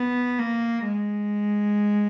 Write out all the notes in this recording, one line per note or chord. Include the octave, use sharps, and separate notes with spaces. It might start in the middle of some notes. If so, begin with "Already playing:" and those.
Already playing: B3
A#3
G#3